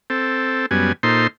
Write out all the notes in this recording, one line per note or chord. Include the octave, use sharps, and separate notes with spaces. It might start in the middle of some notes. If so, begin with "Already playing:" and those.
C4 A4
F#2 G3 B3 G#5
A#2 D#4 A4 C5 C6